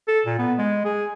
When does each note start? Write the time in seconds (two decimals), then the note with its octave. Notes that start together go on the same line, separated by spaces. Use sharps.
0.08 A4
0.26 A#2
0.39 B3
0.58 G#3
0.85 G#4